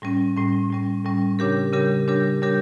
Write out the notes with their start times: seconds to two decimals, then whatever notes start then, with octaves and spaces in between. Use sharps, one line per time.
0.02 A2 G3 C#4
0.36 A2 G3 C#4
0.70 A2 G3 C#4
1.05 A2 G3 C#4
1.39 C#3 G3 D4 G4 A#4
1.73 C#3 G3 D4 G4 A#4
2.08 C#3 G3 D4 G4 A#4
2.42 C#3 G3 D4 G4 A#4